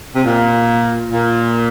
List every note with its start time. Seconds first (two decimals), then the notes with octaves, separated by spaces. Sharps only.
0.15 C3
0.23 A#2
1.10 A#2